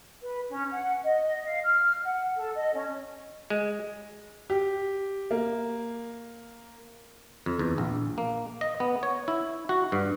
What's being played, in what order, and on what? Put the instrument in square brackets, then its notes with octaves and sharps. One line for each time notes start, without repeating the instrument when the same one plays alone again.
[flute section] B4
C#4
F#5
D#5
F5
F6
F#5
A4
D#5
C#4
[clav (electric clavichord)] G#3
[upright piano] G4
A#3
[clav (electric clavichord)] F2
E2
A#1
A#3
D#5
B3
C#5
E4
F#4
G2